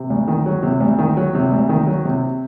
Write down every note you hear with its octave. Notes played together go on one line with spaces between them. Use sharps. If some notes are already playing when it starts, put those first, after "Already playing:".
Already playing: C3
D2
D#3
F#3
C3
D2
D#3
F#3
C3
D2
D#3
F#3
C3